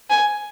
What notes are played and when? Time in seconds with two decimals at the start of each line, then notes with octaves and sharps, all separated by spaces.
0.10 G#5